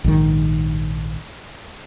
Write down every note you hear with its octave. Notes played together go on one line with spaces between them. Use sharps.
A#1 G#2 D#3